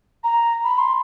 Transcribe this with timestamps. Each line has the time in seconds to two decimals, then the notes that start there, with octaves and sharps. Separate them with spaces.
0.24 A#5
0.64 B5
0.78 C6